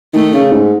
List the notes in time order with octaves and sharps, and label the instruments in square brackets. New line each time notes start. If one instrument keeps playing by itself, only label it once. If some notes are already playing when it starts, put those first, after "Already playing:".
[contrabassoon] D#3 [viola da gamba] A3
[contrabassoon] C#3
G#2